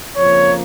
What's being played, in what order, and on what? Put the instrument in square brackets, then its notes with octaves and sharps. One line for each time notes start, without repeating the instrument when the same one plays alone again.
[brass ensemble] F2 C#3 F3 A#3 C#5